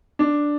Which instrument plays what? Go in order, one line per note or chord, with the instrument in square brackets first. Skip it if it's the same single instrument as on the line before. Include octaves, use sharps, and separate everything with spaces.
[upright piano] D4